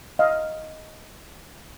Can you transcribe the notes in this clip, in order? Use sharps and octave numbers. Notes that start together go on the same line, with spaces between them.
D#5 F5